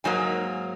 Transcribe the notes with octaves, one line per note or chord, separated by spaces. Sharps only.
G#2 F#3 A#3 G#5